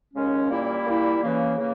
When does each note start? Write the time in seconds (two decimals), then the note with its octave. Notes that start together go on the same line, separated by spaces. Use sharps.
0.14 D#2 C#3 G#3 C#4
0.49 A#2 G3 A#3 E4
0.86 A#2 G3 A#3 E4
1.21 C#3 E3 A#3
1.57 C#3 E3 A#3